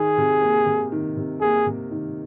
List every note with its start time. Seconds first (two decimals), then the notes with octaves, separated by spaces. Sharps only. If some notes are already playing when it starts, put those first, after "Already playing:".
Already playing: D#3 G#4
0.18 C3
0.42 A#3
0.66 C3
0.92 D#3
1.17 C3
1.41 A#3 G#4
1.66 C3
1.91 D#3